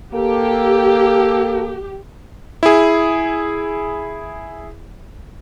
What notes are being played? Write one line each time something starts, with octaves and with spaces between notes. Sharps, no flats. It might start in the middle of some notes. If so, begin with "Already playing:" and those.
A#3 G4 A4
E4 G#4